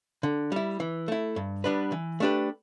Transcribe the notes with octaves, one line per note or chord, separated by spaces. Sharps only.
D3
G3 E4
E3
A3 E4
G2
G3 B3 D4 B4
E3
A3 D4 G4 B4